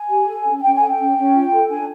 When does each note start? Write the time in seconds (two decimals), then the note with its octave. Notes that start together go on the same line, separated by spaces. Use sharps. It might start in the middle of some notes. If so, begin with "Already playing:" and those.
Already playing: G#5
0.08 G4
0.26 A4
0.45 C#4
0.58 G#5
0.62 C#4 G5
0.75 G#5
0.81 A4 F#5
0.87 G5
0.99 C#4
1.17 C#4
1.35 F4
1.52 A4
1.70 D4 G#5